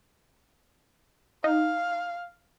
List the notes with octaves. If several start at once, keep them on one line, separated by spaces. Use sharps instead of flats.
D#4 F5